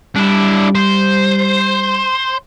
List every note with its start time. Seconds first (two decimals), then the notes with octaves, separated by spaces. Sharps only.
0.16 G3 D4 E4
0.75 C5